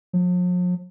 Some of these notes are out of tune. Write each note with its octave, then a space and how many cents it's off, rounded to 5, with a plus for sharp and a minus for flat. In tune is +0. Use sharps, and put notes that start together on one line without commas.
F3 +45